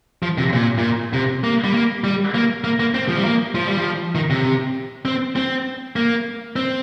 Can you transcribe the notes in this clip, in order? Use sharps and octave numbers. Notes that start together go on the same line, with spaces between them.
F3
C3
A#2
A#2
C3
A#3
G3
A#3
G3
A#3
A#3
A#3
C4
F3
G3
A#3
F3
G3
F3
D#3
C3
C4
C4
A#3
C4